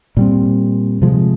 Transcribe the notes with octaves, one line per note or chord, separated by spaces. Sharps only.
A#2 G3 C4
C3 F3 G#3